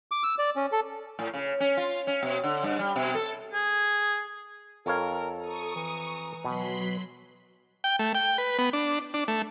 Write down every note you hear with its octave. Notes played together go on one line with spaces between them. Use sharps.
D6
E6
D5
C#4
A4
A2
C#3
C#4
F4
C#4
B2
D3
G2
G3
B2
A4
G#4
F2 A4 A#4 C#5 F5
A#5 C#6 D#6
E3
B2 F#3 B5 C6
G5
A3
G5
B4
B3
D4
D4
A3